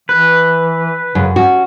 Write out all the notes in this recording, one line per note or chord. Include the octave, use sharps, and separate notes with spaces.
E3 B4
F#2 C#3
C#4 F#4